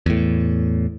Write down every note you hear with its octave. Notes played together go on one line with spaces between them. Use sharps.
E2 A2